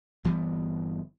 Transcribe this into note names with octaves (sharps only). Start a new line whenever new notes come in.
G1 E3 G3 B3